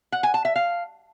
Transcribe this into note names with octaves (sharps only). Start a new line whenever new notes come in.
F#5
G#5
A5
E5
F5